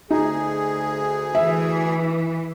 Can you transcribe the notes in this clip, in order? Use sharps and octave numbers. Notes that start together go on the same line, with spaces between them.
D2 D#4 G#4
E3 E5